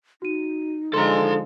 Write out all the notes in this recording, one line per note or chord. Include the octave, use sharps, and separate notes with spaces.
D#4 F#4 D#7
D3 F3 G#3 A4 A#5 C6